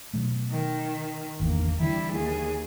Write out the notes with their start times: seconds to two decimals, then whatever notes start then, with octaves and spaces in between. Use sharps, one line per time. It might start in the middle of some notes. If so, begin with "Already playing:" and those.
0.14 B2 F#3 A3
0.51 D#3
1.40 G#1 E2 D3 A#3
1.79 D3 E3 G3 E4
2.12 D#2 G#4